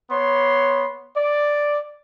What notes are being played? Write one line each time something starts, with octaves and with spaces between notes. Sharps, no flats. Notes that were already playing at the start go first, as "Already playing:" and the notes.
B3 C#5 C6
D5